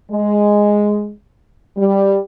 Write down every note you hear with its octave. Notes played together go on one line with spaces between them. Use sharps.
G#3
G3